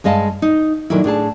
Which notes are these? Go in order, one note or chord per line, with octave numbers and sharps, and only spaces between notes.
G2 G#3 D#5 F5 A5
D#4
A#2 D3 D#3 F#3 E4
A2 D4 G#4 A5